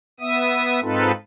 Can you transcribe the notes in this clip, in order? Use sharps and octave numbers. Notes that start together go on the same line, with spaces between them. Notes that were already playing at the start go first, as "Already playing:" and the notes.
B3 E5 D#6
G#2 C4 D#4 F4 A4 B4